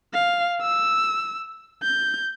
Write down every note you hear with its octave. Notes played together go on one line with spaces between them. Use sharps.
F5
E6
G6